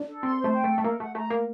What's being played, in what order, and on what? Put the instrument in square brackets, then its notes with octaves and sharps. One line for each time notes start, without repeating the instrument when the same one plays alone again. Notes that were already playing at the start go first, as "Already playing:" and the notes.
Already playing: [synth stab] D4
[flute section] A4
[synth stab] C4 [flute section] C6
[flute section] C5
[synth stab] A3
[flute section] G5
[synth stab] A3
[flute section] A4
[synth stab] A3
[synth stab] A#3 [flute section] A#4
[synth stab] A3 [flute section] F#5
[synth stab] A3 [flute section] A#5
[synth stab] A#3 [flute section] A#4